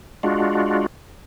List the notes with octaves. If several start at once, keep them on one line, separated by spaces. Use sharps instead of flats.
G#3 D4 F4 F#4